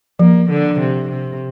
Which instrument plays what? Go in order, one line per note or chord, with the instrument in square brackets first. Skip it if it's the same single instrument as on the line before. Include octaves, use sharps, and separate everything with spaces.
[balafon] F3 [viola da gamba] A#3
[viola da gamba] D3
C3
C3